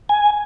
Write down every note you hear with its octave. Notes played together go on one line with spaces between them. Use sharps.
G#5